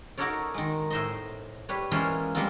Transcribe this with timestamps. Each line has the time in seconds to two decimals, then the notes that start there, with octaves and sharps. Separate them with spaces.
0.17 D#4 F#4 A4 A#4 C#5 D5
0.54 D#3 G#3
0.90 A2 C5 D#5
1.69 G3 B4 C#5
1.91 E3 G#3 A#3 C#4 F4 C5
2.35 G3 G#3 A#3 C4 F4